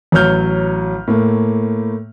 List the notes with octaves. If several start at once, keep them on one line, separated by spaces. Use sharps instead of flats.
A1 F#3 C#5 F6 G6
A2 A3 A#3